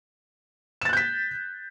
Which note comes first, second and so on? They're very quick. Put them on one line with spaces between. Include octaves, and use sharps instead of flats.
E7 A6 F#6 G6 B6